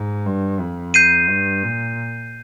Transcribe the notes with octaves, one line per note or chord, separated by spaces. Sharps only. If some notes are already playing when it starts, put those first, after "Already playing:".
Already playing: G#2
G2
F2
G6 C7 D#7
G2
A#2